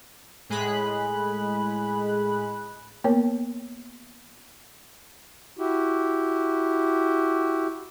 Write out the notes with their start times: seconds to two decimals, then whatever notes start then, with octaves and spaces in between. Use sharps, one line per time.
0.49 A2 G#3 G#4 B5 F#6
3.04 A#3 B3 A#4 C#5 G5
5.59 E4 F#4 G4